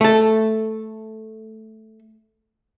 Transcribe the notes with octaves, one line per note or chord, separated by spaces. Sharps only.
A3 A4